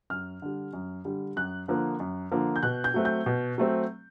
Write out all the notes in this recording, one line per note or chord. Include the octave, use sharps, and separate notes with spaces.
F#2 F6
D3 G3
F#2
D3 G3
F#2 F#6
D3 F3 A#3
F#2
D3 F3 A#3
G6
B2 F#6
G6
F#3 A3 C4
G6
B2
F#3 A3 C4